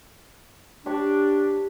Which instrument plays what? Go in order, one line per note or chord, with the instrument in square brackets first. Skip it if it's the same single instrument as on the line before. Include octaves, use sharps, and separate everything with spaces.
[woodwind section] D4 [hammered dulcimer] G4 C#5